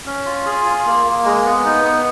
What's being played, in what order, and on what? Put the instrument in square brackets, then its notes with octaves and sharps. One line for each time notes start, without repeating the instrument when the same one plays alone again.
[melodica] C#4
F4
G#4
F4
A#3
A#3
G#3
B3
D#4
B3